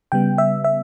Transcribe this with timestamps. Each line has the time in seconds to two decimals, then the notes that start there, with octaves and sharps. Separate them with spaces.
0.12 C#3 G3 B3 G5
0.38 E5
0.64 E5